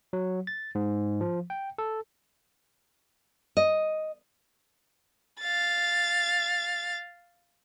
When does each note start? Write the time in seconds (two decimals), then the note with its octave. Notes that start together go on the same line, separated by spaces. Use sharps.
0.13 F#3
0.47 A6
0.75 G#2
1.21 F3
1.50 G5
1.78 A4
3.57 D#5
5.40 F5 A6